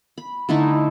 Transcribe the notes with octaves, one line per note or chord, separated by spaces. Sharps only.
B5
D3 A3 D#4 E4